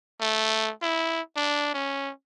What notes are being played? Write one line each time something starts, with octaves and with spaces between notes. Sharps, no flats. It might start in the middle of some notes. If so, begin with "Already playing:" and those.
A3
E4
D4
C#4